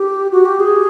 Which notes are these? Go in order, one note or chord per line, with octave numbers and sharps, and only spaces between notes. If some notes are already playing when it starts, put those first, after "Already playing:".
Already playing: G4
F#4
G4
G#4